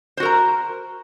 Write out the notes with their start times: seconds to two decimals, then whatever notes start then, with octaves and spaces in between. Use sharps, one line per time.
0.17 C5
0.20 F#4
0.23 A#4
0.25 A#5